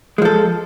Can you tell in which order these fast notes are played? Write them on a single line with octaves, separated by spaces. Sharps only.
G#3 F3 A4